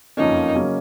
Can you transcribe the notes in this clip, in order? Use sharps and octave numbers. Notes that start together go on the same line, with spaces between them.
F#1 F2 F3 A#3 C#4 D#4
C#3 F#3 A#3 C#4